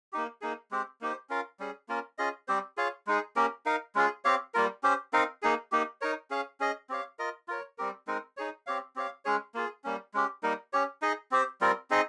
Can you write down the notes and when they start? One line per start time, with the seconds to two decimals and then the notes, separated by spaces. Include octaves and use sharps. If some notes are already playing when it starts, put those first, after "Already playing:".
0.13 A#3 D#4 G4
0.41 A#3 D#4 G#4
0.71 G#3 C4 G4 C5
1.01 A#3 D#4 G4 C5
1.29 C#4 F4 A#4 F5
1.60 G3 C#4 G#4
1.89 A#3 C#4 F4 A#4
2.18 C#4 F4 G#4 D#5
2.48 G3 C4 G4 C5
2.77 F4 G#4 C#5 F5
3.07 G#3 D#4 G#4
3.36 A#3 C#4 G4 A#4
3.66 D#4 A#4 F5
3.95 G#3 C#4 F4 G#4
4.25 C4 G4 C#5 F5
4.54 G3 A#3 F4 A#4
4.83 C#4 G4 C5
5.13 C4 D#4 A#4 F5
5.42 A#3 D#4 G#4
5.72 A#3 D#4 G4
6.01 D#4 A#4 C#5
6.30 C#4 G#4 C#5 F5
6.60 C#4 G#4 D#5
6.89 C4 G4 C#5 F5
7.19 F4 A#4 D#5
7.48 F4 A#4 C#5
7.78 G3 C4 G4 A#4
8.07 G#3 C4 D#4 A#4
8.37 D#4 G#4 C#5
8.67 C4 G4 C#5 F5
8.96 C4 G4 C#5 F5
9.25 G#3 C#4 G#4 C#5
9.54 A#3 F4 G#4
9.84 G3 A#3 C#4
10.14 G#3 C#4 G4
10.43 G3 A#3 D#4 A#4
10.73 C#4 G4 C#5
11.02 D#4 G#4 D#5
11.31 C4 G4 C5
11.61 G3 C4 F4 A#4
11.90 C4 D#4 G#4 D#5